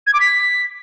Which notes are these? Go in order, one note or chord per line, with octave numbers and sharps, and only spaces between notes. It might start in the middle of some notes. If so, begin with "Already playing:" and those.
G#6
D6
B6